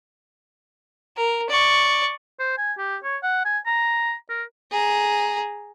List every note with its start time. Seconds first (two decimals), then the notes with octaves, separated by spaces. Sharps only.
1.17 A#4
1.49 D5 C#6
2.39 C5
2.58 G#5
2.78 G4
3.04 C#5
3.23 F#5
3.45 G#5
3.67 A#5
4.30 A#4
4.71 G#4 A#5